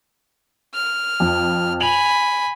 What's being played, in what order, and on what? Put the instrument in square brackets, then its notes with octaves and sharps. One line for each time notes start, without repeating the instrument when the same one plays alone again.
[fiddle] F6
[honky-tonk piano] F2
[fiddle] G#5 B5 [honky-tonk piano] F7 F#7